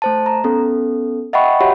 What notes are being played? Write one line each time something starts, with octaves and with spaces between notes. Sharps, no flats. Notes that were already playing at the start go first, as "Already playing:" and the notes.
A3 C5 A5
A#5
B3 C#4 A4
D#5 E5 F#5 G5 B5 C#6
F#4 G4 C#5 E5 F#5 B5